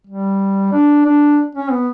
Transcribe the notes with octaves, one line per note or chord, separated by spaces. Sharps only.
G3
D4
D4
C#4
B3